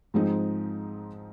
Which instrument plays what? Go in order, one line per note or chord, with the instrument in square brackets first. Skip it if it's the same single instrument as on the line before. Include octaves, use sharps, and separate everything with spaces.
[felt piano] G#2 F3 G#3 C4 D#4